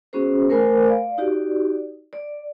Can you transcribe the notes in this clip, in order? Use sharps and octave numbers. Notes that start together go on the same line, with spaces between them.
B3 C#4 F#4 G#4 C5
A3 A#4 C5 G#5 B5
D5 F5
D#4 F#4 G4 D5
D5